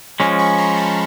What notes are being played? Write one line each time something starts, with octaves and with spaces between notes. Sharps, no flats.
F3 G#3 C#4 A#5 C6
B5 C#6
A#5 C6
A5 B5